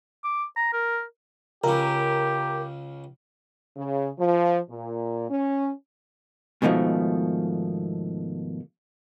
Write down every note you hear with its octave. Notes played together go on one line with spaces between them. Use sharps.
D6
A#5
A#4
C#2 C#3 G4 A#4
C#3
F3
A#2
C#4
G#2 B2 D#3 F3 A3